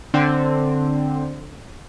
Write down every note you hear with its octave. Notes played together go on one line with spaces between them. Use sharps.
D3 C4